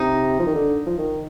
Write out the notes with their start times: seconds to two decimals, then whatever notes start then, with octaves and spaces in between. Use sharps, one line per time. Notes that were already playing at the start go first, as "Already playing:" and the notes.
Already playing: C3 D#4
0.39 F3
0.46 D#3
0.55 D3
0.86 F3
0.98 D#3